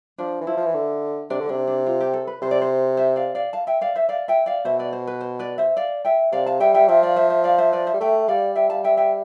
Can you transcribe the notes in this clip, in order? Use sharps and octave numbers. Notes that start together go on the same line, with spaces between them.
F3 D4
E3
F3 E4
F3
E3
D3
C3 D4
D3
C3 D4
D4
F4
G4
A4
B4
C3 C5
D5
C5
C5 E5
D5 F5
D5 F5
F5 A5
E5 G5
D5 F5
C5 E5
D5 F5
E5 G5
D5 F5
B2 C5 E5
B4 D5
C5
B4
C5
B4 D5
C5 E5
D5 F5
E5 G5
C3 D5 F5
F5 A5
G3 E5 G5
E5 G5
F3 E5 G5
D5 F5
C5 E5
C5 E5
D5 F5
C5 E5
B4 D5
C5 E5
G3
A3 E5 G5
G3 D5 F5
E5 G5
F5 A5
E5 G5
E5 G5